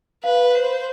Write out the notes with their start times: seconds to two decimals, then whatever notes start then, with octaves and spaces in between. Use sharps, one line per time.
0.24 B4 F5
0.55 C5